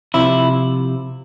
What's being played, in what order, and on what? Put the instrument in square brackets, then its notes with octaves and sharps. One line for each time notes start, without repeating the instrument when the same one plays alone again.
[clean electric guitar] C3 F3 E4